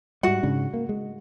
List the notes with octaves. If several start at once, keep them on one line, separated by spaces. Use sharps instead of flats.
G#2 G3 F#4 F#5
G#2 C#3 D4
A#3
G#3